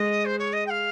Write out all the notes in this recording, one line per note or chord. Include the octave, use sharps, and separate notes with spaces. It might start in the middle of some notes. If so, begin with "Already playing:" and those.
Already playing: G#3 D#5
C5
C#5
D#5
G5
F5